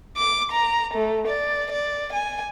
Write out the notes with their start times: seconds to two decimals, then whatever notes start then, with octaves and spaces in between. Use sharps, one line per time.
0.18 D6
0.52 A#5
0.94 A3
1.27 D5
1.72 D5
2.13 G#5